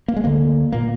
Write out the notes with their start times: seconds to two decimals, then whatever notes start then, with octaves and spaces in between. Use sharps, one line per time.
0.08 A#3
0.17 G#3
0.24 D2 D3 A#3
0.72 A#2 A#3